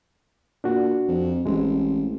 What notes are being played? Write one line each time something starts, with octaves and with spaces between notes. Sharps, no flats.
A#2 D4 F#4
F2
A1 G#3 C4 E4